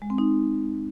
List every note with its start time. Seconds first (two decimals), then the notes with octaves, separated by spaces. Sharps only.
0.02 G#3
0.10 C4
0.18 D#4